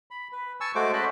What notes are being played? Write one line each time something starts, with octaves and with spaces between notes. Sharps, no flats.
B5
B4
G#5 A5 C#6 E6
G#3 A3 F#4 C5 D6
C#4 B4 C5 D#5 A5 B5